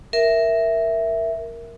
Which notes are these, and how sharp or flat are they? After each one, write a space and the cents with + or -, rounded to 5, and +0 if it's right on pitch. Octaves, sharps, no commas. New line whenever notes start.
A#4 +0 E5 +0